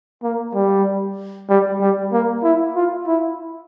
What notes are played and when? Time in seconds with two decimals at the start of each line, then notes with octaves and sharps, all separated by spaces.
0.23 A#3
0.55 G3
1.49 G3
1.81 G3
2.12 A#3
2.44 E4
2.76 F4
3.07 E4